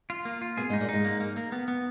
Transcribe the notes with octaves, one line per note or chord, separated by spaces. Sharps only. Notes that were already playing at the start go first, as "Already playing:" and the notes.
F4
A#3
F4
B2 B3 G#4
G#2 G#3
D#4
A#2 A#3
G#2 G#3 D#4
A#3
A#3
A#3
B3
B3